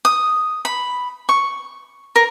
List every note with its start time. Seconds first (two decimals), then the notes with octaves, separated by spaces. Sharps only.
0.05 D#6
0.65 B5
1.29 C#6
2.16 A#4